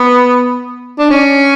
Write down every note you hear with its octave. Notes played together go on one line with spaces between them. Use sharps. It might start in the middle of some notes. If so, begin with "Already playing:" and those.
Already playing: B3
D4
C#4